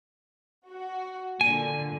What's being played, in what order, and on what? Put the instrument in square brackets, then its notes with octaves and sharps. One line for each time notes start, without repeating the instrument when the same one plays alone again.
[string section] F#4
[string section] A#2 D3 [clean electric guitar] G#5